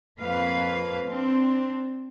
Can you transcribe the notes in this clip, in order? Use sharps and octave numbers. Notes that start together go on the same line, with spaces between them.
F2 A#3 B4 F5
C4 D4